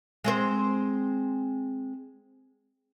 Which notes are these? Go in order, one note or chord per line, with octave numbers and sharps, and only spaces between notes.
G#3 C4 C5